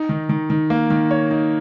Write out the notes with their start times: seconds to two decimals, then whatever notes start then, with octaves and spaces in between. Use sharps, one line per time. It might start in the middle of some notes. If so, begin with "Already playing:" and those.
Already playing: D#4
0.09 D#3
0.29 D#3
0.50 D#3
0.70 A#3
0.90 D#3
1.11 C#5
1.31 D#4